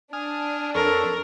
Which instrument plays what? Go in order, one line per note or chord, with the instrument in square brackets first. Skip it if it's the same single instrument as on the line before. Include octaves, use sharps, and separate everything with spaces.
[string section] D4 [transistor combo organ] G#5 D#6 F6
[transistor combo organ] F2 C#5 [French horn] A4 [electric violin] A#4